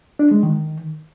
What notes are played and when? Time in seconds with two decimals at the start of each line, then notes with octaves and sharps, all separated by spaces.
0.19 D4
0.31 G#3
0.43 D#3